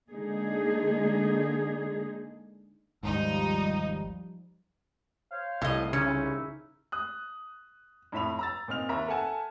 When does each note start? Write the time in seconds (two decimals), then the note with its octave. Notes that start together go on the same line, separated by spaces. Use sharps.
0.11 D3 G#3 A#3 D#4 G#4
3.03 G#1 D#2 G#2 F3 G3 D#4
5.31 C5 C#5 F5
5.62 C2 A2 D#5
5.93 C#3 C#4 D#4 E4 E5
6.92 D#6 F#6
8.12 F2 A2 E5 B5 F7
8.39 A#5 E6 A6
8.68 A#2 C4 D#4 F6 F7
8.89 D#2 E5 A#5
9.08 A4 E5 F#5 G#5 A5